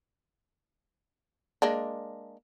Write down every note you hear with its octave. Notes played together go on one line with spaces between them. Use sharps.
G#3 A#3 D4